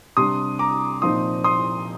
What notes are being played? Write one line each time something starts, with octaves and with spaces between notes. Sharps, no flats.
C3 G3 D4 C6 D#6
A#5 D6
A#2 F3 C4 D#4 C6 D#6
C6 D#6